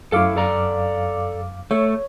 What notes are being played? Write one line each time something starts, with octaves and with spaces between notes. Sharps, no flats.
F#2 E4 A4 F5 D6
A4 D5 A#5
A3 C#5